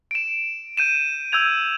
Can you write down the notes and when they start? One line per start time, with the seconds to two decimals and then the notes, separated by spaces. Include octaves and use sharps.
0.11 D7 E7
0.77 G6 D#7 E7
1.32 E6 G6 G#6 F7